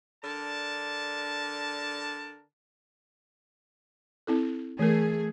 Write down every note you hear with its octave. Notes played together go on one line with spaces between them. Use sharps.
D3 D4 A#4 A5
C4 E4 A4
E3 A3 G#4 A#4